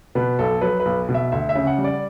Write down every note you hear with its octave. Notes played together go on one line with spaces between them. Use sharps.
B2 B4
B1 A4
F#3 B4
B4
B1
B2
E5
D2 E5
E5
C#3
F#5
G3
D5